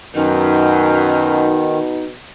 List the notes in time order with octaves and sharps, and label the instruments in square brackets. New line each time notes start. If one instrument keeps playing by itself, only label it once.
[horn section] F#2 [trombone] B2 [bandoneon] D#3 [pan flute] D#4